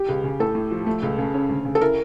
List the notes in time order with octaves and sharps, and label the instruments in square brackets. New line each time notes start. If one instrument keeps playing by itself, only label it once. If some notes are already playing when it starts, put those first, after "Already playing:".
Already playing: [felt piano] G4
[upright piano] C#2
C#3
[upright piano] A2 [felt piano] A4
[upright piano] A2
F3
A3
C#2
C#3
C#4
D2
C#3
[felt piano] A4
[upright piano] E4 [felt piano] A#4